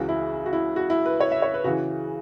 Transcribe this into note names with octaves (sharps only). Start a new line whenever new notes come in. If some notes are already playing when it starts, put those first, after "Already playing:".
Already playing: C#2 C#3 E3 F#4
E4
F#4
E4
F#4
E4
B4
C#5
E5
C#5
B4
C#3 E3 F#4